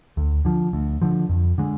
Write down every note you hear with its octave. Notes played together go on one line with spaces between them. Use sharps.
D2
D3 F3
D2
D3 F3
F2
D3 G#3